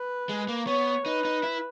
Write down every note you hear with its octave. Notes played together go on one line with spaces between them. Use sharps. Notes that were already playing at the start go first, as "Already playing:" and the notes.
Already playing: B4
G#3
A#3
B3 C#5
D#4 B4
D#4
E4